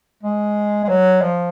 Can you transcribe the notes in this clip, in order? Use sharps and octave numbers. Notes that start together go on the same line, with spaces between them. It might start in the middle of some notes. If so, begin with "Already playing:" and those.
G#3
G#3
F#3
F3